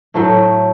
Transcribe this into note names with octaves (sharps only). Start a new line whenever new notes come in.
A2 F#3 A3